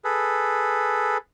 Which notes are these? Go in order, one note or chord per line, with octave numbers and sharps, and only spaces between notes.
G#4 A4 B4